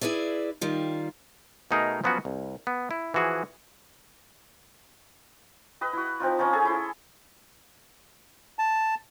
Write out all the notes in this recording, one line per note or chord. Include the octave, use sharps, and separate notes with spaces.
E4 G#4 B4 D5 E5
D#3 G3 F4
B2 A3 D#4 G#4 A#4
F3 F#3 B3 C#4 F#4
C2
B3
E4
E3 F3 F#4 G#4
B4 D#5 G5
E4 F#4
F3 C4 D#4 F4
F3 C#4 D#4 F4
G#4 A4 G#5
E4 C6
A5